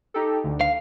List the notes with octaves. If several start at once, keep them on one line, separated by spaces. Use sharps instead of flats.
D#4 G4 A4
D2
F5